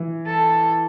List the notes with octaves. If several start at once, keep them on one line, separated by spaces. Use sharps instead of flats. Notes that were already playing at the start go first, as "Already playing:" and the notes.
Already playing: E3
A4